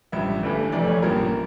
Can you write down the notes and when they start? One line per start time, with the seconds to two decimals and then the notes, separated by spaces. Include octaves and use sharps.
0.12 A1 G2 F3 E5
0.43 G1 G2 E3 A3
0.72 F1 F2 E3 A3 D5
0.87 C#5
1.02 A1 G2 F3 A#3 A#4